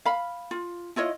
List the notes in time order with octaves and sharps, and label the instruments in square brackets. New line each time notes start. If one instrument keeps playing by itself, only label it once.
[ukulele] F5 B5
F4
E4 F4 C#5 D#5